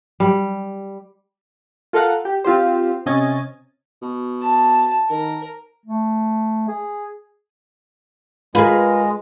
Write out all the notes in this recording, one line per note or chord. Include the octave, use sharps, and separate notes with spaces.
G3
F4 A4 A#4 F5 F#5
G4
C4 F4 G4 C5
C3 C#4 D#5 G#5 A6
B2
A5
D#3 A#4
A3
G#4
G#3 F4 G#4 A#4 B4